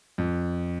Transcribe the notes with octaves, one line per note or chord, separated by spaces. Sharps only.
F2